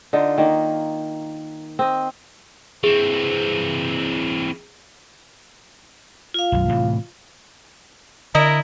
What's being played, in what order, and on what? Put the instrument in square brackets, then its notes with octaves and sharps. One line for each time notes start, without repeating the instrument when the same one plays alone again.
[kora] D3 D#4 F4
D#3 A#3
C4 D#5
[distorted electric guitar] E3 C4 [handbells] G#4
[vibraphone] F4 F5
[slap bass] B1 F#2
A2 C3 E3
[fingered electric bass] D3 [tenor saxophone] E4 [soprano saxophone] A#4 [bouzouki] D#5